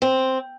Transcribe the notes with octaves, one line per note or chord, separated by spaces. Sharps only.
C4